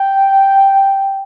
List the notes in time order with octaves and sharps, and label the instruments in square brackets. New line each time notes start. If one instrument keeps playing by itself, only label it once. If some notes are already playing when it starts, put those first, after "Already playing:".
Already playing: [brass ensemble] G5